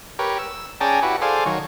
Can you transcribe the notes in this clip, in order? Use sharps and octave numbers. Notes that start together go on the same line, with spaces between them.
G4 A#4 B4 C#5
E6
C#4 G#4 D5 G5 A5 A#5
E4 F#4 G4 B4
G#4 A4 C5 D5 F5
D#3 F#3 C#5